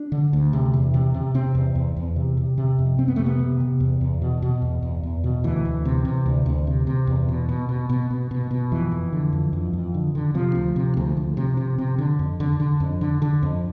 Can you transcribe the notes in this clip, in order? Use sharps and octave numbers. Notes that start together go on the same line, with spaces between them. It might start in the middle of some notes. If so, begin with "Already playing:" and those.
Already playing: D4
D3
D2
C3
E2
C3
C3
C3 C4
E2
E2
E2
C3
C3
C3
F2
F2 C4
B3
C3 A3
B3
C3
C3
E2
E2
B2
B2
E2
E2
E2
B2
D2 E3
D2
C3
C3
D2
D2
C3
C3
E2
B2
B2
B2
B2
B2
B2
B2
F2 E3
F2
D3
F2
F2
F2
D3
D3
C3 F3
D2
C3
D2
D2
C3
C3
C3
D3
F2
D3
D3
F2
D3
D3
F2